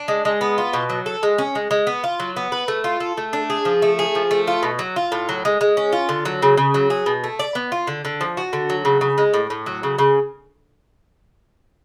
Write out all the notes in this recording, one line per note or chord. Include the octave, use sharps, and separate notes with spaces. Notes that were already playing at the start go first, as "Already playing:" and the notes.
Already playing: D4
G#3
G#3
B3
F4
B2
F#3
A4
G#3
C#4
G#3
G#3
B3
F4
F#3
B3
B4
A3
F4
A4
A3
D4
G#4
F3
A3
G#4
F3
A3
F4
B2
F#3
F4
A2
F#3
G#3
G#3
C#4
F4
D3
F#3
C#3
C#3
F#3
G#4
B2
A3
D5
B3
F4
D3
D3
F3
F#4
D3
F#3
C#3
C#3
G#3
A2
A2
F#3
C#3
C#3